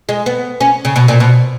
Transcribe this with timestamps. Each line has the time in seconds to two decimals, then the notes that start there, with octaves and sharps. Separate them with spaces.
0.09 G#3
0.26 B3
0.61 C#4
0.85 C#3
0.96 B2
1.08 A#2
1.20 B2